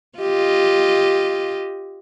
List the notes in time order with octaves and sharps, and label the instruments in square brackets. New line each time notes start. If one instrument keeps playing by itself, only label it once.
[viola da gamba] F4 G4 D#5